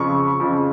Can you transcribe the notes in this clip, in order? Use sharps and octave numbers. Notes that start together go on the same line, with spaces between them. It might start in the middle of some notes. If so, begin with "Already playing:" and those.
Already playing: F2 C#3 F3 C#6
F2 C#3 F3